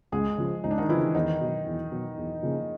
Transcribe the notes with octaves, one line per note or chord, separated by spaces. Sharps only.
C#2 G#3 G#4
C#3 F3
C#2 D#4
D4
D#3 D#4
C#3 E3 F3 E4
E2 D#3 D#4
B2 F#3
E2
B2 F#3
E2
C#3 F3 A#3